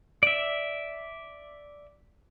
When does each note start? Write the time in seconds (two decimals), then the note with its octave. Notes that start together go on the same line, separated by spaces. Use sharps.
0.23 D5 E5